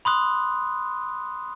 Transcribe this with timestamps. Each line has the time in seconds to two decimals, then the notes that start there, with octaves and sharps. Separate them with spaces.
0.05 B5 C6 D#6 F#6